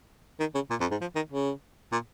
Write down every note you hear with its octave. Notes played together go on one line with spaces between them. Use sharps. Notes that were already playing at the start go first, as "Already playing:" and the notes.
D#3
C#3
A#2
F2
G#2
F3
D#3
C#3
A#2